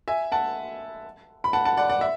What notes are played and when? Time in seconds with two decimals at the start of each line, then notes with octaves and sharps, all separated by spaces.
0.08 E5 G#5
0.32 F#5 A5
1.44 B5
1.53 F#5 A5
1.65 F#5 A5
1.77 D5 F#5
1.90 D5 F#5
2.01 E5